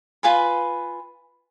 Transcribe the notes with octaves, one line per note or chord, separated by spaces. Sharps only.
F4 B4 G#5 B5